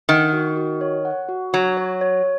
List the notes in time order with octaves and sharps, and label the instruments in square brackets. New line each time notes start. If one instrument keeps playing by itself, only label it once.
[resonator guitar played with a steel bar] D#3 [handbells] F#5
[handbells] F#4
F#4
C#5
F#5
F#4
[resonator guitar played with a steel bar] F#3 [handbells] F#4
[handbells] C#5
C#5